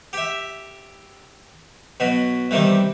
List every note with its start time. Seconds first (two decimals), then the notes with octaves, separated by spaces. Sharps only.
0.13 G4 E5
2.00 B2 F#3
2.51 C3 D#3 E3 G3